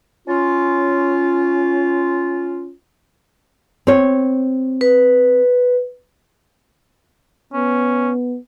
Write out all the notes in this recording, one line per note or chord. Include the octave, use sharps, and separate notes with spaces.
C#4 F4
C4 C#5
B4
B3 C#4